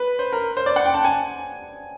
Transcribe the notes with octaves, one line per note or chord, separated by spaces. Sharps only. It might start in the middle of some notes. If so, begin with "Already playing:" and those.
Already playing: B4
C5
A#4
C5
D5
F#5
G5
A5
G#5